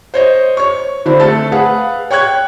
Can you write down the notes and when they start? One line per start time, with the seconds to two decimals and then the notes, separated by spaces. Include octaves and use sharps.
0.14 C5 C#5 D#5
0.57 C#5 C#6
1.06 D3 C4 D4 E4
1.20 A3 A4 A6
1.52 G#4 B4 F5 F#5
2.11 C#5 G5 C#6 F#6 G#6